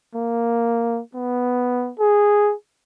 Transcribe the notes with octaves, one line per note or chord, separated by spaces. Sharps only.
A#3
B3
G#4